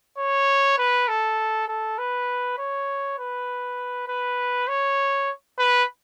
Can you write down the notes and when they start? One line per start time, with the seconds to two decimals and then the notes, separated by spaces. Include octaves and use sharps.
0.18 C#5
0.78 B4
1.08 A4
1.68 A4
1.98 B4
2.58 C#5
3.18 B4
4.08 B4
4.68 C#5
5.58 B4